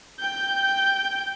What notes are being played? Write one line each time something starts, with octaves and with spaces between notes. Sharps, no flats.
G5 G6